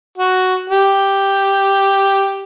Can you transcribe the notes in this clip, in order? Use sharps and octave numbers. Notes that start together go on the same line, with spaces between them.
F#4
G4